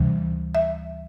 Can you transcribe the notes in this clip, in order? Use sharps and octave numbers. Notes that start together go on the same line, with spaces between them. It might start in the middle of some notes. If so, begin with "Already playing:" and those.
Already playing: D2 C3 E3 G3
E5